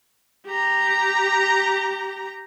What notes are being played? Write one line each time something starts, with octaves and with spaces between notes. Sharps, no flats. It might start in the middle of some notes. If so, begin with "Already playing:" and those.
G4 A#5